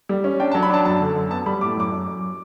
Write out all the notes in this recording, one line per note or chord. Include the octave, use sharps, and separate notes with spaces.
G3
C#4
D4 G5
A5
F#3
B5
D4 A5
F#2 A5
D3
F#2
B3 A5
G3 B5
A2 D6
F#2 D6
F#2
F#2